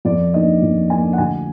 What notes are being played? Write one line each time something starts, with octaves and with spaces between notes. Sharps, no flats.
F2 D5
D#3 A#3 D4 D#5
F2
D#3 A#3 D4 G#5
F#5
D2 G#5